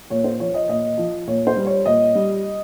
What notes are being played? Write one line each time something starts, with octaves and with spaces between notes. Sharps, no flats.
A#2 C#5
C5
F3 C#5
D#5
A#2 D#5
F3
A#2 C#5
C5
G3
C#5
A#2 D#5
G3